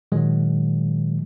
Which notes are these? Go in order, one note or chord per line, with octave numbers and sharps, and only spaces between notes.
A#2 D#3 F#3 G#3